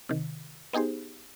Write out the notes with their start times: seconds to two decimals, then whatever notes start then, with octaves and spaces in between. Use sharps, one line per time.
0.09 C3 D#3
0.73 B3 D#4 G4 G#4 C5